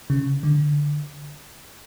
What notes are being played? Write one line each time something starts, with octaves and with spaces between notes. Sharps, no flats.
C#3
D3